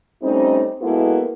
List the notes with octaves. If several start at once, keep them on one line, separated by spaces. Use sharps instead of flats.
G3 A3 C4 C#4 D#4
G#3 A#3 B3 E4 F#4 A4